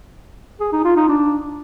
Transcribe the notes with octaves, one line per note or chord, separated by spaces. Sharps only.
G#4
D#4
F4
D#4
D4